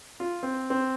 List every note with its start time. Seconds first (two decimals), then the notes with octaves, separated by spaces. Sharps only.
0.20 F4
0.43 C4
0.70 C4